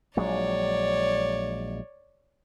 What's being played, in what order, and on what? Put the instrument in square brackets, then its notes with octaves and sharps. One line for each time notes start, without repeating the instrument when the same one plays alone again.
[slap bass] A#1 F#3 G#3 [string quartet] C#5 D5